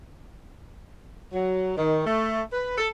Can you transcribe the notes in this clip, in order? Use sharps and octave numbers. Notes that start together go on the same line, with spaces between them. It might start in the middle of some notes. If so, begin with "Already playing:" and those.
F#3
D#3
A3
B4
A4